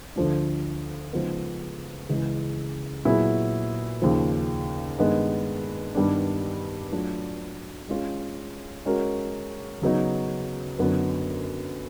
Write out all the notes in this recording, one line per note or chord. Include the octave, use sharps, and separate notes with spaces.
D2 D3 F3 A3 D4
C#3 F3 G#3 B3 D#4
C#2 C#3 E3 G#3
A#2 F#3 B3 E4 G#4
D#2 C#3 F3
G2 D#3 G#3 B3
G2 D#3 G3 B3 D4
F#3 A3 D4 F4
G#3 C#4 F4
G#3 C#4 F#4 A#4
C#3 F#3 B3 D#4
F#2 D3 F#3 B3 D#4